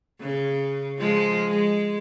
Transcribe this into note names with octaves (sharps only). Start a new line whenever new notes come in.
C#3
F3 G#3
G#3